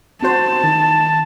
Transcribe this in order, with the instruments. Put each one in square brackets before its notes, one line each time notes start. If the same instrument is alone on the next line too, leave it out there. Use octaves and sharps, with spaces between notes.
[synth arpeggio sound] C4 F#4 C5 [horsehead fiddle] A5
[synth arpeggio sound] D#3